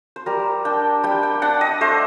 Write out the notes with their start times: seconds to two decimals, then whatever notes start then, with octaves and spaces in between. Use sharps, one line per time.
0.16 C5
0.26 G3 A#4
0.65 D4 G5
1.03 G3 G5
1.23 G5
1.42 D4 F#5
1.61 D#5
1.81 A3 C5